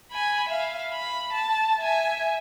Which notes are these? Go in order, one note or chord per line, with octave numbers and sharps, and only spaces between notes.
G#5 B5
E5 F5
B5
A5
E5 G#5